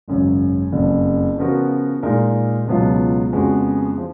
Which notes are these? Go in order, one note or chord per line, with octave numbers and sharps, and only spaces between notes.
G#1 F#2 C#3
F#1 F2 C#3
C#3 F3 B3 F#4 A#4
A#2 G#3 D#4 A#4
C#2 B2 F#3 B3 F4
F2 C#3 G#3 B3 F#4
F3